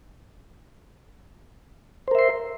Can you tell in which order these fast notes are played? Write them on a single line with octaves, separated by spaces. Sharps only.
C5 A#4 E5 C6